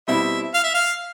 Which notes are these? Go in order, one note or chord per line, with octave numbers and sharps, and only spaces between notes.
B2 G3 C4 E4 E5
F5
E5
F5